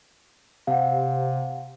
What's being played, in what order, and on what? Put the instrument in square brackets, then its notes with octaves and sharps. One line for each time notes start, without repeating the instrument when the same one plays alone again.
[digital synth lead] C3 [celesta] F5 F#5